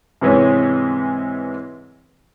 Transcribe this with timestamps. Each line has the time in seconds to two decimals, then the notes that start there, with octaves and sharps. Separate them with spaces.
0.21 G#2 C3 E3 G#3 B3 C#4